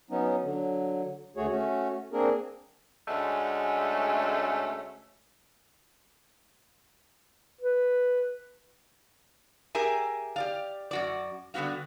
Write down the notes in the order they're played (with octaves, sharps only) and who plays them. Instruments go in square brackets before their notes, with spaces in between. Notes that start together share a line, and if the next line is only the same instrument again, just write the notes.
[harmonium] F#3 B3 C#4 D#4
D3 F#3
D2 A3 F#4 G#4 C#5
A3 C#4 F#4
A#3 C4 D4 G#4 A#4
[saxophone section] D2 G#3 A3 C#4
[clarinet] B4
[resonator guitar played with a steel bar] G4 G#4 A#4 E5 G#5
G4 D5 F5
F#2 F#4 D5
D3 G3 B3 F#4 F5